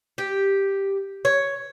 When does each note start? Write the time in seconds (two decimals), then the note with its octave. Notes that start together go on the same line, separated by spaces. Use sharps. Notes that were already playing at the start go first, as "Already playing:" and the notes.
0.18 G4
1.25 C#5